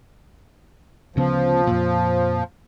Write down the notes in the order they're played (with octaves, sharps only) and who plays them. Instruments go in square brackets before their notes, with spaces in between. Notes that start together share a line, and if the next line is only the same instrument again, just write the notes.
[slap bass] D2 C#3 B3 [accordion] F3
[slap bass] F2 A#2